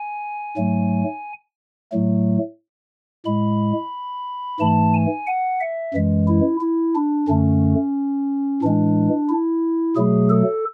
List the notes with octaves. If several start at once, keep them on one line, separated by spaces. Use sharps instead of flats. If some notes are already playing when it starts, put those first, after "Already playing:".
Already playing: G#5
G#2 F#3 A3
A2 F#3 A3
A2 G#3 B5
G#2 E3 A3 A5
G#5
F#5
E5
F#2 E3 G#3
E4
E4
D4
F#2 D3 A3 C#4
A2 E3 G#3 D4
E4
B2 F#3 A3 G#4
A4